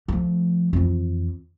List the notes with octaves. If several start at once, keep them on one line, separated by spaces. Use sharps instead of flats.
F3 A3
F2 E3